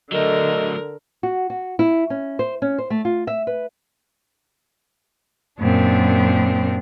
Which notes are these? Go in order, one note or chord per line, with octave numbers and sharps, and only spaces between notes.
D3 F#3 A3 A#4 D#5
F#4
F#4
E4
C#4
C5
C#4
C5
A3
F4
E5
B4
F#2 A#2 C4 D4